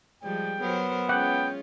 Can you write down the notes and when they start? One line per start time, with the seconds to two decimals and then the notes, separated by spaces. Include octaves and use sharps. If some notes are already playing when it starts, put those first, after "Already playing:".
0.23 F3 G3 G#3 G5
0.61 F#3 B3 A#4 C5
1.09 G#3 C#4 F4 F#5 G5 D6